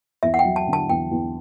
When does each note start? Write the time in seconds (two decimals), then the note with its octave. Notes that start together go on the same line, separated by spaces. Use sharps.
0.23 E2 E5
0.34 F#5
0.39 G5
0.45 F#3
0.56 A5
0.67 D3
0.73 A5
0.90 E2 G5
1.11 E2